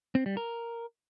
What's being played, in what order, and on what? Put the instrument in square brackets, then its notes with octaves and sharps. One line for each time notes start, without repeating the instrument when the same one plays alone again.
[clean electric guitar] C4
G3
A#4